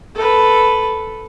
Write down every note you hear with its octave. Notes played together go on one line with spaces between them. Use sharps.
A4 B4